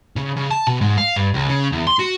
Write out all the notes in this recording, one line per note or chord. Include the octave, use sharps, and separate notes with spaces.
C#3
C#3
A5
B2
G#2
F5
G2
C#2
C#3
E2
C6
F#4